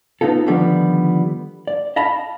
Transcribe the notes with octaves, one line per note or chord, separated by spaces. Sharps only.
B3 D#4 F4 A4
D3 D#3 F3 G3 B3
D5
D#5 F5 A5 B5